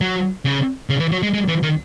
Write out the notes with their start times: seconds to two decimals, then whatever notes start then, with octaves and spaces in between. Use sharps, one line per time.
0.01 F#3
0.45 C#3
0.90 C#3
1.00 E3
1.12 F#3
1.23 G#3
1.34 G#3
1.48 E3
1.63 D#3